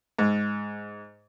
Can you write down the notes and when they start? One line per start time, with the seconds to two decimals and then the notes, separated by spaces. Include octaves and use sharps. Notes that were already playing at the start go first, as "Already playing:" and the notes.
0.19 G#2